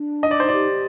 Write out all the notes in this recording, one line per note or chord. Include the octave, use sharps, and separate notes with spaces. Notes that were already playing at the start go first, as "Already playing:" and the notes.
Already playing: D4
D#4 D#5
D5
C5
G4 D5